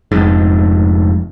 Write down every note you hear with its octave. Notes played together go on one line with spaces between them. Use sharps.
F1 F2 G#2